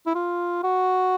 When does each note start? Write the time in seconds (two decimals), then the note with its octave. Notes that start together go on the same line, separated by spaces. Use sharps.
0.06 E4
0.15 F4
0.64 F#4